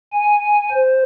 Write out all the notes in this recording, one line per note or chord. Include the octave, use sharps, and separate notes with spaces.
G#5
C5